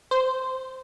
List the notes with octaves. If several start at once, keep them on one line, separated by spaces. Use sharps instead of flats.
C5